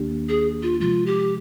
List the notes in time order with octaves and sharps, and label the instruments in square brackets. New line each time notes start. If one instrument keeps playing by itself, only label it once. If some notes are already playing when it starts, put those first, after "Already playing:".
Already playing: [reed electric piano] D#2 D#3 A#3 D4 G4
[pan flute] G#4
F4
[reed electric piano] C3 F3 G#3 [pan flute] F4
[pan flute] G4